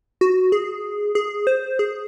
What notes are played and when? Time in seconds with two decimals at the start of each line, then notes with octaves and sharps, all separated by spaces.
0.21 F#4
0.52 G#4
1.15 G#4
1.47 C5
1.79 G#4